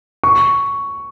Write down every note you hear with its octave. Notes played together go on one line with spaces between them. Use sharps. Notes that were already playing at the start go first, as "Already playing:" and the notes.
C#6